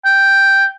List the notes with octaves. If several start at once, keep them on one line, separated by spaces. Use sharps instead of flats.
G5